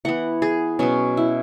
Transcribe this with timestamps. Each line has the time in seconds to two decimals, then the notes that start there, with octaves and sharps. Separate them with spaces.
0.05 E3 B3 F#5
0.42 G#4
0.79 B2 F#3 B3 C#4
1.17 E4